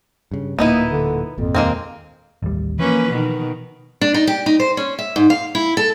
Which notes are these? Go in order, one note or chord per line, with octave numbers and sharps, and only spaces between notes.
G2 C#3
D1 A#2 A#3 B3 D#4 E4
D3
G#1 F2 A#2
D#2 A#2 G#3 A#3 C4
A1 D#2 G3
E3 F3 A#3 C#4 B4
B2 D#3
D4
D#4
G4
D#4
C5
C#4
E5
G#2
F5
E4
A4